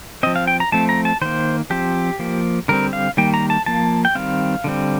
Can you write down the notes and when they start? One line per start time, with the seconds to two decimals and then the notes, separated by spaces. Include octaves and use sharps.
0.23 F3 C4 D#5
0.36 F5
0.47 G5
0.60 A#5
0.72 F3 A3 C4 A5
0.89 A#5
1.05 A5
1.21 D#3 A#3 C5
1.70 F3 C4 G4
2.19 F3 A#3
2.68 D3 G3 C4 A#4
2.93 F5
3.17 D#3 G3 A#3 G5
3.34 A#5
3.50 A5
3.66 F3 A#3 A5
4.05 G5
4.15 D#3 G3 C4 F5
4.64 D3 G3 C4